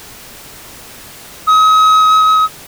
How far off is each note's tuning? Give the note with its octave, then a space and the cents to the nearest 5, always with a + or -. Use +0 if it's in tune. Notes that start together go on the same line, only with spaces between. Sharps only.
D#6 +40